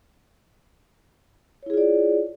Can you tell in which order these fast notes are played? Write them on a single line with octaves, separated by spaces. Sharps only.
C#5 E4 G#4 F4 D5